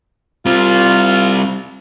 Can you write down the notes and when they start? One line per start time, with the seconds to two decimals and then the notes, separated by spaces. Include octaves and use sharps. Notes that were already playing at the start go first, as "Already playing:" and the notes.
0.46 G3 C4 F4